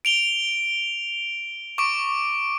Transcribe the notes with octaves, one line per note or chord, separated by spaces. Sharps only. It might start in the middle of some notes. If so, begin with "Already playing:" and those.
D7 F7 G7
C#6 D6 D7